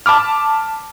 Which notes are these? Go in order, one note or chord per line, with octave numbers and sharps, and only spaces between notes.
A5 B5 D6 F6